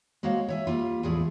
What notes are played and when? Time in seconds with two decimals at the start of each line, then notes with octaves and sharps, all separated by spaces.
0.23 G#3 A#3 F#4 C5 C#5 F5
0.48 C#5 E5 G#5
0.67 G3 A#3 F4
1.03 E2 A2 F3 A3 G#4 D5